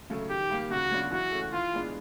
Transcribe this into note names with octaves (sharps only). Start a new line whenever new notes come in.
C#3 F#3 A3
D#3 G4
G3 A#3
C#3 F#4
F#3 B3 D4 F4
E3 F#4
A3 C#4
E3 F4
G#3 B3 D4